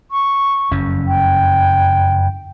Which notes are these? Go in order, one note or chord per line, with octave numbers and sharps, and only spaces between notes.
C#6
F#1 F2 C#4
G5